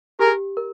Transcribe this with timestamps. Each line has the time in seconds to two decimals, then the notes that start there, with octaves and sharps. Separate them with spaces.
0.19 G4 G#4 A#4
0.57 A#4